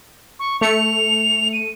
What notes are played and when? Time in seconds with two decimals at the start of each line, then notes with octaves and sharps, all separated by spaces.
0.39 C#6
0.61 A3 C#7 F7
1.53 D#7